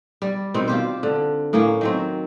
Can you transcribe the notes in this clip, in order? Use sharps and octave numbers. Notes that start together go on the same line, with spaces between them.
G3
B2 D#3 C4
F4 G4 C5
D3
A2 A#3 C#4 C#5
D#3 F#3 C4